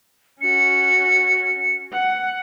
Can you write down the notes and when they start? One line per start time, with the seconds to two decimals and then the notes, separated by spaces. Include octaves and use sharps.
0.41 C#4 F#4 C#7
1.92 F#5